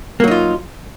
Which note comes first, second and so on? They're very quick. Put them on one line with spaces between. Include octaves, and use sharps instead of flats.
A#3 F#3 D#4 F4